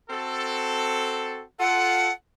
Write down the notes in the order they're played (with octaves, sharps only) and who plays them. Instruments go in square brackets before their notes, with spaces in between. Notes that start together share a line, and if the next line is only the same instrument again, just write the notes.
[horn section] C4 F#4 A4
[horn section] F4 A4 [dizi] F#5